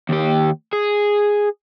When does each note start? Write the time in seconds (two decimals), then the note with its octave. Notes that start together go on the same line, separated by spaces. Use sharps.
0.09 D#2 G4
0.73 G#4